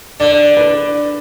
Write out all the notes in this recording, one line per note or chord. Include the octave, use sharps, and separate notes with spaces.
D3 D5
B4